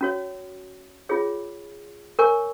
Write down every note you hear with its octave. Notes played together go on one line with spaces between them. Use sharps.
C#4 F#4 C#5
C#4 F4 G#4 C#5
A#4 C#5 G#5 C#6